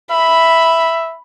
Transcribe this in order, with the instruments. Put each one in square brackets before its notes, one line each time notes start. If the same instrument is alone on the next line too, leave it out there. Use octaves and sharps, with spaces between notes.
[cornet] E5 [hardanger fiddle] B5